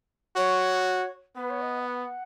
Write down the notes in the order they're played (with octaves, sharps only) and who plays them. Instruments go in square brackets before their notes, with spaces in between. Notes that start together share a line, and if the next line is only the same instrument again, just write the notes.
[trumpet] F#4 [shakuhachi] C#5
[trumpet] B3 [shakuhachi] B4
[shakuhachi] C#5
D#5
F#5